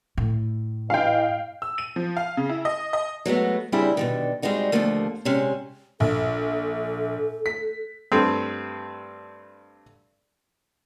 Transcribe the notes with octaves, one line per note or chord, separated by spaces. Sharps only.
A2
E3 D#5 F5 G5
E6
D#7
F3
F5
C#3
E4
D#5
D#5
F#3 G#3 A3 B3
C#3 G3 C4 D4 E4 G#4
B2 D3 D#3
G3 G#3 B3 C4 D#4 F#4
D#2 G#2 D3 F3 A3 A#3
C3 G#3 C#4
A#1 A4
B6
G2 A3 C4